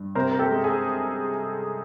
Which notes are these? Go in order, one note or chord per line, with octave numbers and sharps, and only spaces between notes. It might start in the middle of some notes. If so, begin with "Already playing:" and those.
Already playing: G2
C3 A#4 C5
A#4
G4 A4
G#3
G#4